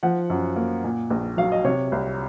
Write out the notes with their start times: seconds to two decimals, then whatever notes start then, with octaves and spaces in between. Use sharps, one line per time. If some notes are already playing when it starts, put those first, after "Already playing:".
0.03 F3 F#5
0.30 F#2
0.56 A#3
0.84 A#2
1.10 A#1
1.37 F#3 F5
1.52 D#5
1.64 C3 C#5
1.92 C2